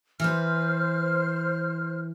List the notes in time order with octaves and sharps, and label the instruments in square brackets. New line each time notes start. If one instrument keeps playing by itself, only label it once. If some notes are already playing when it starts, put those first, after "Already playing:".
[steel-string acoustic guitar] E3 B4 [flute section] C5 F6